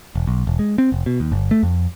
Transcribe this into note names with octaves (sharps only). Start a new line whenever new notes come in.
E1
B1
E1
G#3
C4
F1
B2
D#2
G1
A3
F2